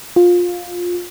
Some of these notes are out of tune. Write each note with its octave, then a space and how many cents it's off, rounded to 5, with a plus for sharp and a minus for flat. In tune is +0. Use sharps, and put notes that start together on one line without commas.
F4 +15